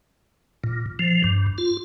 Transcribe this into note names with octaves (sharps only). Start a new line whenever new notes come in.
A#2
F3
G2
F4